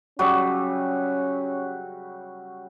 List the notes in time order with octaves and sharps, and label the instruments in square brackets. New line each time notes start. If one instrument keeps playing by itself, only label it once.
[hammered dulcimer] C#3 F#3 G3 [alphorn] C#4 [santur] F#4